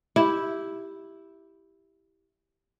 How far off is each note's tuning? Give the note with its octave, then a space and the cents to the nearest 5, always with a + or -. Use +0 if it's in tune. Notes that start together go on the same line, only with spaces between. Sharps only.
E4 +0 G4 +0